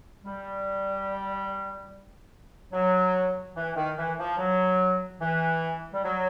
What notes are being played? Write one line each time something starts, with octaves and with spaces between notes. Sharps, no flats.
G3
F#3
E3
D#3
E3
F3
F#3
E3
G3
F#3